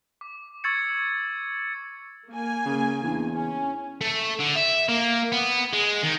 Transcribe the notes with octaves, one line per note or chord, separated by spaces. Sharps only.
D6
C#6 E6 G#6 A6 C#7
A#3 G#5
C#3
E2 D4
C#4 G#5
A3
D3
E5
A#3
B3
G#3
D#3